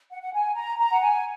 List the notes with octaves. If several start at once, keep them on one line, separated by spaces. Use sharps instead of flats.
F#5
F#5
G#5
A#5
A#5
F#5
G#5